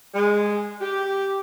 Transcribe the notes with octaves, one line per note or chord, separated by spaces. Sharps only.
G#3
G4